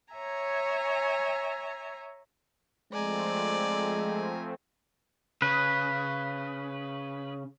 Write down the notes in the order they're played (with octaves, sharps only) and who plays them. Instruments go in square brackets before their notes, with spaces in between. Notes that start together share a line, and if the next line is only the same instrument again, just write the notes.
[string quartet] C#5 E5 G#5 A#5
[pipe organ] F3 A3 C4 [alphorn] G#3 [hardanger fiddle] D5 [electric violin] G#5 A#5
[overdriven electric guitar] C#3 [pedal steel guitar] B4